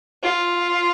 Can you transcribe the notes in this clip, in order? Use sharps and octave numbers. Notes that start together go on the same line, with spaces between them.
F4